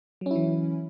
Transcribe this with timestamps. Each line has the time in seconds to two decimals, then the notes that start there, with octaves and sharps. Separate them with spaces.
0.21 F#3
0.26 C#4
0.31 E4
0.35 E3